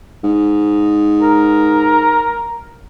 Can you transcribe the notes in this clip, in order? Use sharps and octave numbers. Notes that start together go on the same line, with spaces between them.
G#2
A#4